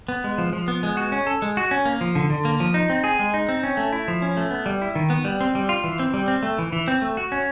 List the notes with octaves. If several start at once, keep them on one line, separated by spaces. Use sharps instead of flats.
B3
G#3
F3
F3
B3
G#3
F#4
C#4
A4
G#3
F#4
C#4
A#3
F3
D3
D3
A#3
F3
D#4
C4
G#4
G#3
D#4
C4
C#4
A3
E4
F3
C#4
A3
B3
G3
E4
D#3
B3
G3
C4
G3
F4
E3
C4
G3
C4
A3
E3
E3
C4
A3
F#4
C#4